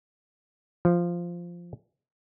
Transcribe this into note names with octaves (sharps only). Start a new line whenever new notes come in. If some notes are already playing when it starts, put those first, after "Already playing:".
F3